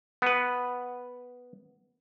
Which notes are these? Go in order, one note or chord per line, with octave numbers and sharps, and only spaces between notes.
B3 B4